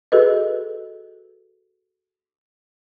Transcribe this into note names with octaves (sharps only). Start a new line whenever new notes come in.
F#4 G#4 A4 B4 D#5